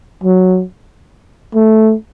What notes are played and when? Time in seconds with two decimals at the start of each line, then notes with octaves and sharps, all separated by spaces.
0.23 F#3
1.54 A3